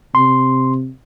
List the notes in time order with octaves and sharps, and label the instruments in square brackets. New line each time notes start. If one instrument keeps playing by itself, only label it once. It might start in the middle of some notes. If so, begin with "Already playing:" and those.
[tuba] C3 [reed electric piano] C6